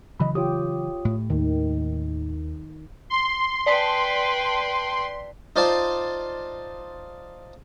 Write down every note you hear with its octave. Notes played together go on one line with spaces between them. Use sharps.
C#3 E3 F#3 D#5 B5
F4 G4 C#5 D#6
A2
D#2 D#3
C6
B4 D5 G5 A5 B6
D#4 F4 C5 D5 F5 A5